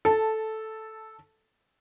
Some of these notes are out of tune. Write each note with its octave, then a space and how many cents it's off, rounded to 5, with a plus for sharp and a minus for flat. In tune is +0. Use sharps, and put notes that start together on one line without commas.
A4 -5 A5 +5